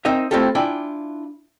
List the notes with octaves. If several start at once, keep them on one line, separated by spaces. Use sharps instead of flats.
C4 D#4 A#4 D#5 E5
A3 C4 E4 F4 G4 A4
D4 E4 F4 G5 G#5